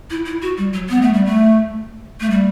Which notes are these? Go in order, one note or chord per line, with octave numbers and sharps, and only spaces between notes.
E4
E4
F#4
G3
F#3
B3
A3
G3
A3
A3
G3